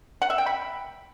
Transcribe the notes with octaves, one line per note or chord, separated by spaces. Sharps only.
F#5
E5
G5
B5